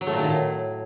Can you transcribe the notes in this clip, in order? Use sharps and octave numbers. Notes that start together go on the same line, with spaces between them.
F#3
A3
A#2
D#3
A2